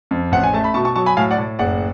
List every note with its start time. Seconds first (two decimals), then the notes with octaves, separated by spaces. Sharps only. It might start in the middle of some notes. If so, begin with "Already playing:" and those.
0.11 F2
0.32 A1 F#5
0.44 G#5
0.54 A3 A5
0.64 B5
0.74 B2 A5 C#6
0.85 A5 C#6
0.96 F#3 A5 C#6
1.06 G#5 B5
1.17 A2 F5 G#5
1.31 D5 F#5
1.38 A2
1.59 F#1 D5 F#5